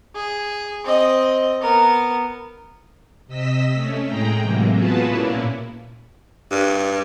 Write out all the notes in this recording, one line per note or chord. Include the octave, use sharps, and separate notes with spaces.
G#4
C4 D#5
B3 A#4
C3 D#5 E6 B6
A3 C#4
A2 G#3 G#4 G5 A#5
A2 C3 E3 F#3 G#3 A#3
B3 F4 F#4 G#4 B4 A5
A#2 A#3 C#4 E4
G2